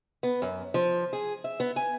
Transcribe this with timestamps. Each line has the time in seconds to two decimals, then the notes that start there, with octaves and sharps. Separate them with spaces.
0.23 B3
0.42 F#2
0.74 F3
1.13 G#4
1.44 E5
1.60 B3
1.76 G#5